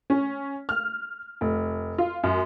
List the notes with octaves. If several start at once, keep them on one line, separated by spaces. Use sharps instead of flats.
C#4
F6
F1
F4
F#2